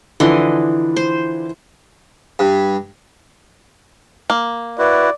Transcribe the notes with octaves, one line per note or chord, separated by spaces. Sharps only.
D3 E3 F3 D4 D#5 C6
C5
G2
A#3
E4 F#4 B4 D5